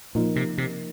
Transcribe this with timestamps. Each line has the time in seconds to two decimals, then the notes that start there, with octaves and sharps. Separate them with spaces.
0.15 A#2 F3 A#3 D#4 A#4
0.36 C3
0.58 C3